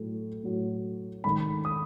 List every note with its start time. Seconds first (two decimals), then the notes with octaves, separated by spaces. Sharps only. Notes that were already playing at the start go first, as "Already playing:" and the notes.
Already playing: A2 F#3 A3
0.44 A2 F#3 A3
1.24 G#2 D#3 A3 B5
1.65 D#6